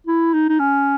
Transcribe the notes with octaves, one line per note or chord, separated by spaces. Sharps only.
E4
D#4
D#4
C#4